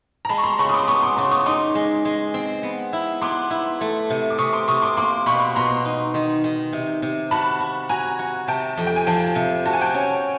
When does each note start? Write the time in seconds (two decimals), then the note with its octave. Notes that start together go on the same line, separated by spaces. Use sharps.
0.25 A#5
0.29 G#3 A5 B5
0.38 C#6
0.44 A#5 C6
0.59 C#3 B5 C#6
0.69 D#6
0.74 C6 D6
0.88 B3 C#6 D#6
1.02 C6 D6
1.17 C#3 C6 D6
1.31 C#6 D#6
1.46 D#4 C6 D6
1.75 G#3
2.05 G#3
2.34 C4
2.63 B3
2.93 E4
3.22 B3 C6 D6
3.51 E4
3.81 A3
4.10 C3
4.30 D6
4.38 C3 C#6 D#6
4.53 C6 D6
4.68 C3 C#6 D#6
4.82 C6 D6
4.97 A#3 C6 D6
5.26 B2 B5 C#6
5.56 B2 A#5 C6
5.85 D#4
6.14 D#3
6.44 D#3
6.73 C3
7.02 C3
7.31 F#4 A5 B5
7.60 F#4
7.89 F#4 G#5 A#5
8.19 F#4
8.48 C3 G5 A5
8.77 F2
8.87 G5
8.96 G#5
9.07 F3 G5 A5
9.35 C3
9.65 F#4 A5
9.73 G#5
9.81 G5 A5
9.95 C#4